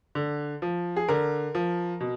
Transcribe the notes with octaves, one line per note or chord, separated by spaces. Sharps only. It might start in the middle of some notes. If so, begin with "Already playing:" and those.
D3
F3
G#4
D3 A#4
F3
B2